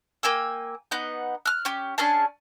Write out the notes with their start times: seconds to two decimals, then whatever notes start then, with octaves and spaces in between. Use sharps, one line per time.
0.23 A#3 G5 G#5 E6
0.91 B3 D#4 F#5 G6
1.46 F6 F#6
1.65 C#4 G4
1.98 C#4 D4 G#4 A5